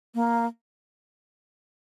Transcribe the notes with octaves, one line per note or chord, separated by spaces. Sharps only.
A#3